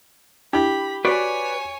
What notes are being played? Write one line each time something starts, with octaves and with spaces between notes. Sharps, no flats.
D4 E4 G4 B5
F#4 B4 C#5 D5 G#5